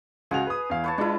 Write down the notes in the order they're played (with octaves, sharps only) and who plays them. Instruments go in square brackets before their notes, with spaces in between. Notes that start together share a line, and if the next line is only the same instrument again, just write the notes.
[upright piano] C#2 F#4 F7 [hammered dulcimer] G#4
[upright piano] B4 D#6
E2 F5
[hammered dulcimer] B4 C#5 A5
[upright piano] G#3 F4 [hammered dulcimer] D4 E4